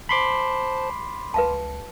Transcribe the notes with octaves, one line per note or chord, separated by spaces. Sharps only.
C5 A5 B5 C6 D6
C#2 B4 F5 A5